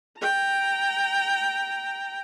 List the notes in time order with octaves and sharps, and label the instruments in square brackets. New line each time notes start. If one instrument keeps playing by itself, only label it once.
[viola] G5 A#5